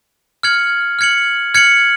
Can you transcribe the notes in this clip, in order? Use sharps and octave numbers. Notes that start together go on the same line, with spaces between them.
F6 G#6 C#7 F#7
F6 G#6 C#7 F#7
F6 G#6 C#7 F#7